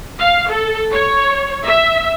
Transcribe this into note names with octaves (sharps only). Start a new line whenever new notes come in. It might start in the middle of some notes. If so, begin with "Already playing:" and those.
F5
A4
C#5
E5